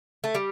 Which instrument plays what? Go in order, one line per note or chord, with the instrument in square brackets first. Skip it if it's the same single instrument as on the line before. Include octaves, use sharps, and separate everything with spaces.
[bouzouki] A3
G3